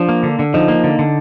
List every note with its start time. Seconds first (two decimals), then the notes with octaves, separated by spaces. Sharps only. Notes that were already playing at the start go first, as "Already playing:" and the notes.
Already playing: F3 D4
0.09 A#3
0.23 D3
0.39 D3
0.54 F3 D#4
0.68 A#3
0.84 D3
0.99 D3